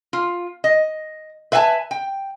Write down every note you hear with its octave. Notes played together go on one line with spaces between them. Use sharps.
F4
D#5
B4 E5 F5 G#5 A5
G5